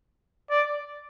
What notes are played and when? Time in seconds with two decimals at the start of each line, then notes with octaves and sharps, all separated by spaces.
0.50 D5